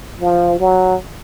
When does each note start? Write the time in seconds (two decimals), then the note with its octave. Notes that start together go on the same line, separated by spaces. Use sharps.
0.21 F3
0.60 F#3